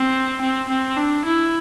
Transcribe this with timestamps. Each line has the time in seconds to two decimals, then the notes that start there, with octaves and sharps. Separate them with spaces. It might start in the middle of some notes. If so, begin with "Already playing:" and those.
Already playing: C4
0.41 C4
0.69 C4
0.97 D4
1.25 E4